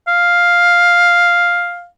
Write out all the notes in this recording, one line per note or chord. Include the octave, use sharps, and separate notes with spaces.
F5